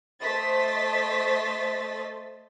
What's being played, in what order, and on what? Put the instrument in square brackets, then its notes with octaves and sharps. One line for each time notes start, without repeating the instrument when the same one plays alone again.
[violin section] A3 C5 D#5 A6 B6